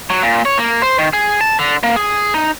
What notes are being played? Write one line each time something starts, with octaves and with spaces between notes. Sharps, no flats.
F#3
A#2
C#5
A#3
C5
D#3
G#4
A5
D3
A#3
G#4
D#4